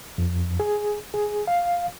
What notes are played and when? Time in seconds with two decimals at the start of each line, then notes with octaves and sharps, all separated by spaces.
0.18 F2
0.60 G#4
1.14 G#4
1.47 F5